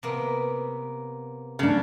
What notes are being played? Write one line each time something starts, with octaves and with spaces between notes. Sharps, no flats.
C3 A#3 B3
D2 C#3 D4